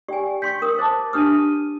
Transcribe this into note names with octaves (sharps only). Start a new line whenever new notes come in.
G4 D5 G5 G#5
G5 C6 C#6 G6 B6
A#4 G5 D#6
C5 A5 D6 A6
D4 G4 D#6 F6 D#7